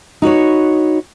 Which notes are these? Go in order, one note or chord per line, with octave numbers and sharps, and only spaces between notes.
D#4 F#4 B4 C#5